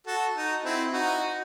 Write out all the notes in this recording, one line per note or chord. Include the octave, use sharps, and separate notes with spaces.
F#4 A4
D#4 F#4
C4 E4
D#4 F#4